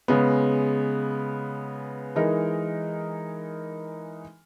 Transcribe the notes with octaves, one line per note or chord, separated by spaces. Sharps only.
C#3 G#3 B3
E3 G#3 D#4 A#4